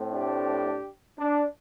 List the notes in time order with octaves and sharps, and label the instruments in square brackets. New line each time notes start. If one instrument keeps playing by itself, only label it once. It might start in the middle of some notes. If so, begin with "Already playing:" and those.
Already playing: [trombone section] A2 A3 C4
D4 G4
D4